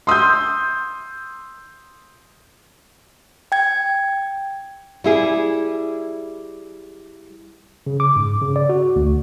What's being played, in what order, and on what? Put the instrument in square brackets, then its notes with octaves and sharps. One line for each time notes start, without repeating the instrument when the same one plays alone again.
[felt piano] C6 D#6 E6 G6
[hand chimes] G5 G#6
[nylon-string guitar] G3 E4 G#4
[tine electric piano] C#3
D6
G#2
C#3
D5
F#4
D2